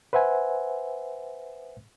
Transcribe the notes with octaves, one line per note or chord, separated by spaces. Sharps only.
B4 C5 E5 F#5 G#5